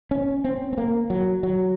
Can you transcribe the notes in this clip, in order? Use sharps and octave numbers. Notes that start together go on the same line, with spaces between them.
C#4
C4
C4
A#3
F#3
F#3